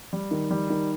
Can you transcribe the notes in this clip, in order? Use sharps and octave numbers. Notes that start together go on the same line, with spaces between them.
G3
D#3
G3
D#3